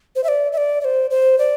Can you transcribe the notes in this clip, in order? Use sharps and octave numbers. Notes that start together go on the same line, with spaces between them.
C5
E5
D5
E5
D5
D5
C5
C5
D5